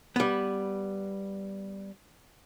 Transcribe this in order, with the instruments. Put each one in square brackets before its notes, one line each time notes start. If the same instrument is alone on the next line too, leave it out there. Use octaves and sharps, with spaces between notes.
[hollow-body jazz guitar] G3 B3